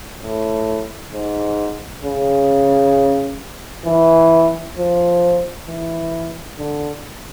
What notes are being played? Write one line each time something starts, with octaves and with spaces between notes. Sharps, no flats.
A2
G#2
C#3
E3
F3
E3
D3